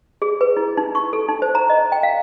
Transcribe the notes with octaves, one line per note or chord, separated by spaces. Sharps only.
G#4
B4
E4
D#4
C#6
A4
D#4
C5
A#5
D#5
G5
F5